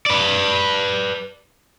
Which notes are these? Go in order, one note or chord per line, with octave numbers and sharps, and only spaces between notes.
B4 D5